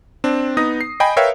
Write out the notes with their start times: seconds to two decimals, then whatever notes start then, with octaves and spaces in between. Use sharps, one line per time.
0.24 C4 D4
0.57 B3 D#4 D#6 A#6
0.81 C7
1.00 D#5 G5 G#5 B5
1.17 A#4 B4 C#5 E5 F5 G5